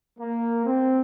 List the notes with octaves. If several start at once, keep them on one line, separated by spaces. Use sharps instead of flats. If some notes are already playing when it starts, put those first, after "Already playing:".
A#3
C4